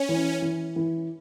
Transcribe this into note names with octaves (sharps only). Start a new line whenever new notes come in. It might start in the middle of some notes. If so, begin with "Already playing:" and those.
Already playing: C#4
E3
E3
E3